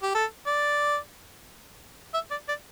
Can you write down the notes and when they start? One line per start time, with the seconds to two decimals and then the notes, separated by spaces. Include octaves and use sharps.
0.03 G4
0.15 A4
0.47 D5
2.14 E5
2.31 D5
2.48 D5